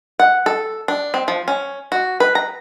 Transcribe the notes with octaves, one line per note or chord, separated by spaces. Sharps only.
F#5
A4
D4
C4
F3
C#4
F#4
B4
A#5